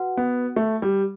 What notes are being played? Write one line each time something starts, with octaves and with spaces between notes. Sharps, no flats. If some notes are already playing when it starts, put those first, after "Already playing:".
Already playing: F#4 B4 F#5
B3
A3
G3